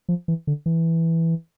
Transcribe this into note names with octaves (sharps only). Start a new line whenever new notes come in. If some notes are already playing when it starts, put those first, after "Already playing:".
F3
E3
D3
E3